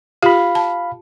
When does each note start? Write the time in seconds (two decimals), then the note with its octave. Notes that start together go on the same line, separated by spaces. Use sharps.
0.23 F4 G4 F5 B5
0.55 A5